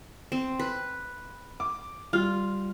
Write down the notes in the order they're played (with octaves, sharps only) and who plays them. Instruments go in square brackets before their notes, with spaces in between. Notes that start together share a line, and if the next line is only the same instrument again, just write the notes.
[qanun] C4
B4
[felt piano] D6
[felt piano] G3 F6 [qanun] F4